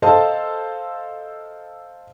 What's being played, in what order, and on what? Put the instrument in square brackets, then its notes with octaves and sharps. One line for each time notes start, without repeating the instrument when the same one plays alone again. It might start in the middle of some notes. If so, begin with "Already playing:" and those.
[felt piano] A4 A#4 C5 D#5 F5 A5